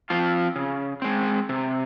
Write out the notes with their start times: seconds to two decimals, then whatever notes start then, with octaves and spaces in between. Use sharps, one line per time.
0.10 F3 C4 F4
0.56 C#3
1.02 G#3 C4
1.49 C3